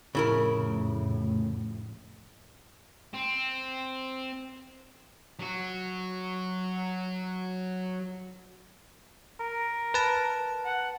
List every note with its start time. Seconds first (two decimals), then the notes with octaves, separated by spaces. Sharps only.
0.15 F1 A2 C#3 E4 A#4
3.14 C4
5.39 F#3 F#4
9.40 A#4
9.94 B4 A5
10.65 F#5